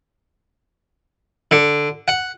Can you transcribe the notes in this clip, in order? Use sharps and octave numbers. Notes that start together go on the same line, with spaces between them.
D3
F#5